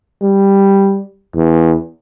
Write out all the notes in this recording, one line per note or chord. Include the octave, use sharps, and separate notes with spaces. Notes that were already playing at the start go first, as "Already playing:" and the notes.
G3
E2